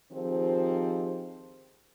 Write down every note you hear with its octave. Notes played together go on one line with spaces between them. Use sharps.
D#3 F3 C4 G4 G#4 C5